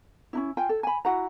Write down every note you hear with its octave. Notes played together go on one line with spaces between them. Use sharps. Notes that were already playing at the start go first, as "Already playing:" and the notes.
C#4 D#4 E4
F4 G5 G#5
A4
G#5 B5
E4 F#4 F#5 A#5